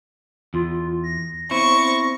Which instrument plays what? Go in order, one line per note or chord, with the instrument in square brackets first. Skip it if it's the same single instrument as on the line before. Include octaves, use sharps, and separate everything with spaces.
[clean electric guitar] E2 [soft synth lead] F4
[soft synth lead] A#6
[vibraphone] B3 C4 C5 [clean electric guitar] E4 [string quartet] C#6